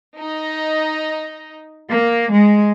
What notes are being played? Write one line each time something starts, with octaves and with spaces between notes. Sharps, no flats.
D#4
A#3
G#3